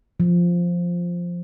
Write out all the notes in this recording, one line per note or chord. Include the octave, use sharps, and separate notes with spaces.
F3